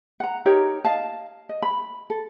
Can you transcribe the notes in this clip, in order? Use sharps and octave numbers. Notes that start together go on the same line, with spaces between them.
F#5 A#5
D#4 G4 A#4 C#5
D#5 F5 A5
D#5
B5
A4